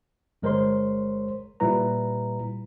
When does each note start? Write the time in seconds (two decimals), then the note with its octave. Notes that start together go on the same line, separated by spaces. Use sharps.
0.42 G1 G#3 A#4 C5 C#5 C6
1.60 A#2 G3 E4 B4 A#5